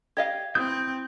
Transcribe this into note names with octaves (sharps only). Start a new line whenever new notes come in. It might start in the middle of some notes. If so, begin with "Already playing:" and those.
G4 D#5 F5 G#6
C4 E4 D#6 G6